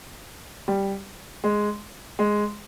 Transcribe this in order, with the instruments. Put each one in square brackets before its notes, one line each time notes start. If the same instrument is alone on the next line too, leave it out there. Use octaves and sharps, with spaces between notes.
[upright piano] G3
G#3
G#3